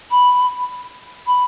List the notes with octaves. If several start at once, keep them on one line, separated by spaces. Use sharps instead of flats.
B5
B5